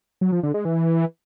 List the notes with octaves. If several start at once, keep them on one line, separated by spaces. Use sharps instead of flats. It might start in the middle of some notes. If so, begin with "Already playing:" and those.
F#3
F3
D3
G#3
E3